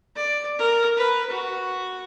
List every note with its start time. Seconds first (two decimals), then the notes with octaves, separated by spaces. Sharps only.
0.16 D5
0.59 A#4
0.97 B4
1.30 F#4